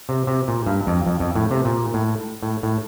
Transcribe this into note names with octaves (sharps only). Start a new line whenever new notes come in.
C3
C3
A#2
G2
F2
F2
F2
A2
C3
A#2
A2
A2
A2